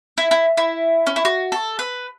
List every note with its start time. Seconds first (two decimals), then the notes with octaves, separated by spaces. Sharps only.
0.18 E4
0.31 E4
0.57 E4
1.07 C#4
1.16 E4
1.25 F#4
1.52 A4
1.79 B4